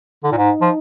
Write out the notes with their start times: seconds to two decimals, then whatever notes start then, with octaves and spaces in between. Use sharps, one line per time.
0.24 D3 D#4
0.32 A#2
0.37 G#2
0.61 F3